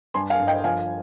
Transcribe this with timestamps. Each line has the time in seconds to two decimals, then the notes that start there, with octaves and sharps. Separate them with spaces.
0.14 G2 G#5 C6
0.30 F5 G#5
0.39 G1
0.47 D#5 G5
0.64 F3 F5 G#5